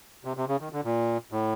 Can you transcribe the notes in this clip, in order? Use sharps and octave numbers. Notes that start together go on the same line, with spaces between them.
C3
C3
C#3
D#3
D3
A#2
A2